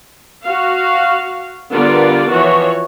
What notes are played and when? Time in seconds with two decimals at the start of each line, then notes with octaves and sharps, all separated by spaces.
0.44 F#4 F5
1.71 D3 G3 B3 F4 A#4 D5
2.30 E3 F3 F#4 C#5